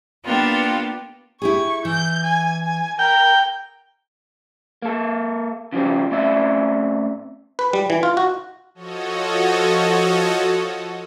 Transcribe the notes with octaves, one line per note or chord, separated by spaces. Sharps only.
A#3 B3 D4 F4 G4
E4 G4 G#4 C#6
E3 G6
G#5
G#5
A#4 G5
A#3 A4
C#3 F3 G3 C4
A2 C4 C#4 D5 E5
B4
G3
E3
F4
F#4
F3 F#4 A4 C#5 D#5